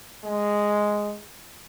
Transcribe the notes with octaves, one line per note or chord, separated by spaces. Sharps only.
G#3